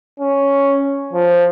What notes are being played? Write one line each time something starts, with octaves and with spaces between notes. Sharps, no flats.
C#4
F3